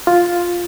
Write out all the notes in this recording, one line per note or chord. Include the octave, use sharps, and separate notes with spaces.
F4